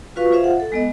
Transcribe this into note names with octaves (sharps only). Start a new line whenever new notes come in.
F4 F#4 B4 F5 C#6
F4 G#4 C5 E5 F5
F#5
A4
G#3 B3 D#5